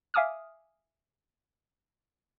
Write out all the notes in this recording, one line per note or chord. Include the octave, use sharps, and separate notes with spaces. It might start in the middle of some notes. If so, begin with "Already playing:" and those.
E5 F5 G#5 D6 D#6 F6